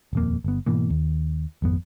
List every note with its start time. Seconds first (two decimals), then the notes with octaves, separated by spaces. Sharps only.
0.13 D#1 F2 A#3
0.44 G1 B3
0.66 G#2 B2 E3 A#3
0.90 D#2
1.62 G#1 F2 B3